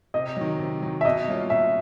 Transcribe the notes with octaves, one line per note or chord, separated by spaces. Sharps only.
C3 D#5
D#3 F#3
C3
D#3 F#3
E5
B2 D#5
G3 A#3 C#4 F4
B2 E5